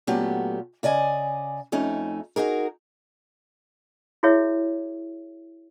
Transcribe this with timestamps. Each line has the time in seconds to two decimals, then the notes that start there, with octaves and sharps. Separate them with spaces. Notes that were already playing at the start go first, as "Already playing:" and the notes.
0.07 A#2 F#3 A3 B3 C#4 G4
0.83 C#3 D5 D#5 G#5
1.72 F2 A3 C#4 D#4
2.36 D#4 F#4 G#4 A#4
4.23 E4 F#4 G#4 C#5 E5